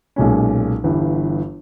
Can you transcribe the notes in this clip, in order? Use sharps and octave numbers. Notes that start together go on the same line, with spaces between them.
B1 A#2 G#3 C#4
G1 G2 E3